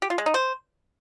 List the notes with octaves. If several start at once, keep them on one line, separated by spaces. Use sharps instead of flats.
G4
F4
G#3
D#4
C5